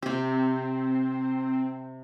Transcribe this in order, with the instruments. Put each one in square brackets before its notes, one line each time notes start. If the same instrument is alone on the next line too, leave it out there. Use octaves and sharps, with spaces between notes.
[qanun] C3 G4 [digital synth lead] C4